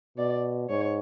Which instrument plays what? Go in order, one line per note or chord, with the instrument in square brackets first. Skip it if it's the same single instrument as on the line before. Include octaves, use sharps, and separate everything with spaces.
[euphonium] B2 [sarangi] D5
[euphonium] G#2 [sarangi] C#5